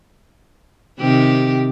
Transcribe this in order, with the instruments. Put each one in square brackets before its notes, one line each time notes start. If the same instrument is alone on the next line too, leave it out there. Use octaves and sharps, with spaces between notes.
[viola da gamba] C3 D#3 G4